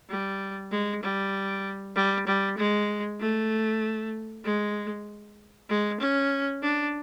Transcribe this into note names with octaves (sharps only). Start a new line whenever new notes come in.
G3
G#3
G3
G3
G3
G#3
A3
G#3
G#3
C#4
D4